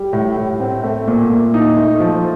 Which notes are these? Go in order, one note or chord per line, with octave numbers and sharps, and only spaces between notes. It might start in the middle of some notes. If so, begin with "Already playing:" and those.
Already playing: G3
A2
A2
C4
A3
A#2
A#2
D#4
A3
F3